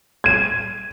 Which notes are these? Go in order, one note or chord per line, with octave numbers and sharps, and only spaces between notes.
G#6 D#7